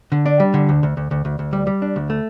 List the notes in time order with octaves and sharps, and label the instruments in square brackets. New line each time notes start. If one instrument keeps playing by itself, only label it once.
[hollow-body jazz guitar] D3
D4
G3
D3
D2
D2
D2
D2
D2
D2
G3
G3
D4
D2
A3